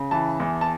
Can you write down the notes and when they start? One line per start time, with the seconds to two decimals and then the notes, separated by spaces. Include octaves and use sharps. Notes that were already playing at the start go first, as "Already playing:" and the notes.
Already playing: C#3
0.11 E3 A5
0.40 E2
0.61 A5